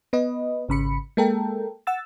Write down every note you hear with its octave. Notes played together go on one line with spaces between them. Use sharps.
B3 B4 D#5
G#1 C#3 B5 C#7
G#3 A#3 A4 A#4 G5
F#5 E6 A6